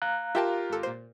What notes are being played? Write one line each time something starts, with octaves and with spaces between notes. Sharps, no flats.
F5 A#5 F#6
F4 G4 A#4 E5 G5 A5
G#1 A4
A#2 C5